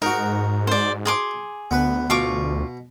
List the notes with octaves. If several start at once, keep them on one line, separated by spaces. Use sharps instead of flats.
G#2 D#4 F#4 A#4
C5 D5
G#4 C6 D6
D2 B3 B4
B2 F4 C#6 D6